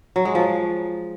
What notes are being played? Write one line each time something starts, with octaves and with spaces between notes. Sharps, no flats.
F#3
G#3
F3